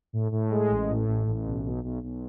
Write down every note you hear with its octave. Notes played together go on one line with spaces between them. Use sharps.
A2
A2
G#3
A1
A2
A1
A1
B1
B1
B1
B1